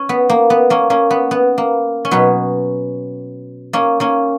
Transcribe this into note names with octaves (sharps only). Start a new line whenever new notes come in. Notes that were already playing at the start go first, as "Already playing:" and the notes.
Already playing: C#4
B3
A#3
B3
A#3 C#4
A#3 C#4
B3
B3
A#3
C#4
B2 F#3 B3
A#3 C#4
A#3 C#4